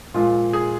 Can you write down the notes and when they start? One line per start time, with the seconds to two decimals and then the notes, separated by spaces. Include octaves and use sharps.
0.14 A#2 F3 G#3 F4
0.53 G#4